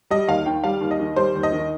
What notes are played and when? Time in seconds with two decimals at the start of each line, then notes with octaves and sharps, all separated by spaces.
0.10 G3 D#5
0.28 D#2 F5
0.46 D#3 G5
0.64 G3 F5
0.81 D#2
0.91 D#5
1.00 D#3
1.16 G3 C5
1.35 D#2
1.43 D#5
1.52 D#3